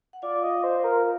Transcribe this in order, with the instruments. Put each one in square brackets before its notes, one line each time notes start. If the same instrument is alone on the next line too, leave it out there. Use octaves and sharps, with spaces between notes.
[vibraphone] F#5
[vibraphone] F4 F5 [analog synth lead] D5
[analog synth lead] D#5
C5
A#4